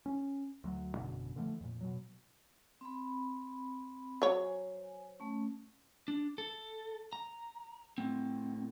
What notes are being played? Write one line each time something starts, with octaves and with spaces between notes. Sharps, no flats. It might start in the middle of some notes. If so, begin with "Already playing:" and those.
C#4
D2 F#3
G#1 F#2 B2 D3
D3 E3 F3 A3
F2 A#2
B2 F#3
C4 B5
F#3 C5 C#5 G#5
A3 C#4
D4
A4
A#5
A2 C4